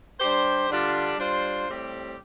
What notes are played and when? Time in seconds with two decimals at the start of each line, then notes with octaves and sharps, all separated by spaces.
0.20 G3 D4 G4 C5
0.69 D3 G3 D4 F4
1.18 G3 D4 F4 C5
1.68 A2 G3 C4 G4